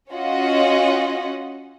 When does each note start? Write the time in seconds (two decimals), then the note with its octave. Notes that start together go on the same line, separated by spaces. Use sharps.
0.11 C#4 F4 F#4 D#5 F#5